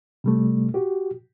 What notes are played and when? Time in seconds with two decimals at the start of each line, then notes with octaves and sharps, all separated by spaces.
0.24 C3 G3 A3
0.74 F#4 G4